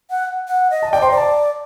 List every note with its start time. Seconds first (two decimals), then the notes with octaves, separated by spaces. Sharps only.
0.10 F#5
0.48 F#5
0.70 D#5
0.82 A5
0.92 D5 G5
1.01 C5 C6
1.09 D5 A#5
1.17 A5